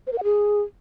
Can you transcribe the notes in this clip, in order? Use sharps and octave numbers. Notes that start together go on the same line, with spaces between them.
C5
A#4
F#5
G#4